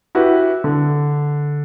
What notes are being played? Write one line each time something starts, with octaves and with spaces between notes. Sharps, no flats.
E4 F#4 G4 B4
D3